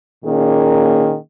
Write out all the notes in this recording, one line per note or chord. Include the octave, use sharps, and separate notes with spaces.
A#2 D#3 A#3 C#4 G#4